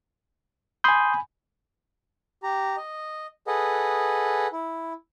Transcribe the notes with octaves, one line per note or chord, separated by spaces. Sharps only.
G#5 B5 C6 D#6 G6
G4 A#5
D#5
G#4 A4 B4 D#5 F#5
E4